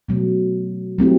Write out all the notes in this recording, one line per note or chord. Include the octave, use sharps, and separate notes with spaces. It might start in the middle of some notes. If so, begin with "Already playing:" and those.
B2 F#3 A3
F#3 A3 C4 E4 G4